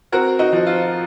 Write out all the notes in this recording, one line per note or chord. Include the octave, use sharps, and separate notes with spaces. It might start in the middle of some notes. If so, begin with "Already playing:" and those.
C4 F#4 A#4
D#4 F#4
F3
F4